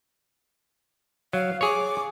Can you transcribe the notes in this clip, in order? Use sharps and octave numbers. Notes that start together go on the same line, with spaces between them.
F#3 F5
G#4 C#5 D6